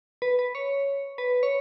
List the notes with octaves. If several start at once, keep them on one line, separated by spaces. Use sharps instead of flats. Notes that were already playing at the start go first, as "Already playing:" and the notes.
B4
B4
C#5
B4
C#5